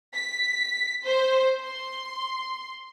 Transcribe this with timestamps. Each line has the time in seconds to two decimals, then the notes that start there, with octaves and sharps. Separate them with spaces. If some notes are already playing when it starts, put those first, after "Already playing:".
0.15 B6
1.05 C5
1.62 C6